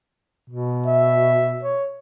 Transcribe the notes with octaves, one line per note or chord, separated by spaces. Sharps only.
B2
E5
C#5